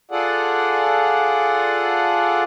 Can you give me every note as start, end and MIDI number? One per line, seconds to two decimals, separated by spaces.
0.11 2.44 65
0.11 2.44 68
0.11 2.44 69
0.11 2.44 74
0.11 2.44 78